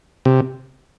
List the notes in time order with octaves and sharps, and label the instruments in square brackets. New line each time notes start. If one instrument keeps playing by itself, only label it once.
[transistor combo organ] C3